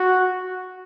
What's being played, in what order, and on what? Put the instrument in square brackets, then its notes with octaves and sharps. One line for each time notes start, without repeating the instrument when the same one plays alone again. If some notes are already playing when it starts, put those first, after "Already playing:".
Already playing: [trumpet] F#4